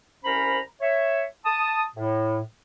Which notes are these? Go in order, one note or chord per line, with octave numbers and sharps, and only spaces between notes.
C2 C#4 A#4 C5 A#5 B5
C#5 E5
A5 D#6
A2